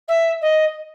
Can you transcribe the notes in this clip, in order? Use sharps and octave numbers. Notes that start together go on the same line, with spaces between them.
E5
D#5